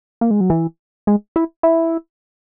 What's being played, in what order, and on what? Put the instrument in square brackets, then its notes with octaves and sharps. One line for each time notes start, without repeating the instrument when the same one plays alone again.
[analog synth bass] A#3
G#3
F#3
E3
G#3
E4
E4